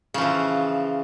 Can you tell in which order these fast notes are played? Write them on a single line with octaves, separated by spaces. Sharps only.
C#3 F3 E3